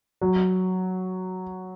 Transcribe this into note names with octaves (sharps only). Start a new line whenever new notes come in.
F#3